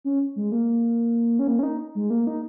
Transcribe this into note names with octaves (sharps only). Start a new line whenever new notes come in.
C#4
G#3
A#3
C#4
A#3
C#4
D#4
G#3
A#3
D#4